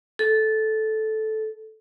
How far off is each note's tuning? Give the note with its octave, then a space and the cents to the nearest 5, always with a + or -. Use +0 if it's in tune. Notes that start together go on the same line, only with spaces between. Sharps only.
A4 -10